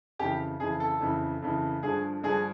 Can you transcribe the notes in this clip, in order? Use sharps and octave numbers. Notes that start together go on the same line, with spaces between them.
F2 C#3 E3 G4
F2 C#3 E3 G#4
A4
F2 C#3 E3
F2 C#3 E3
G2 D3 F3 G#4
G2 D3 F3 G#4